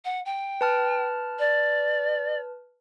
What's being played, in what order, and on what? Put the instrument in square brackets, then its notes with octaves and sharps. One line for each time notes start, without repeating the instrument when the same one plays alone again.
[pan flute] F#5
G5
[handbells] B4 A5 F6
[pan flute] D5